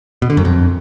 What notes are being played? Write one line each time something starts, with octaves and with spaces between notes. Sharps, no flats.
B2
D3
F#2
F2